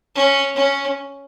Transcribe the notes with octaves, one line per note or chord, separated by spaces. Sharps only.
C#4
C#4